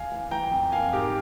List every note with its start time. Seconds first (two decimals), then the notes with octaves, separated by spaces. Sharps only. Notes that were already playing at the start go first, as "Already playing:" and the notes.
Already playing: F5 G#5
0.12 E3
0.31 E3 G5 A#5
0.51 F2
0.72 A#3 F5 G#5
0.93 G#2 G4 A#4